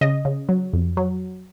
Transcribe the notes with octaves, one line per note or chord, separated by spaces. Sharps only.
C#3 D#5
C#3
F#3
F2
F#3